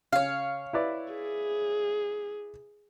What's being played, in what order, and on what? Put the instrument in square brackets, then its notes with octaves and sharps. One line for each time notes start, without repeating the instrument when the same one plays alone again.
[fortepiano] C#3 [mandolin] C#5 F5
[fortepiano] E4 B4 D5
[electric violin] G#4